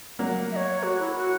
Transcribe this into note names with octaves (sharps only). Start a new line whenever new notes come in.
F#3 A#3
E5
C#5
F#4
E4
F#4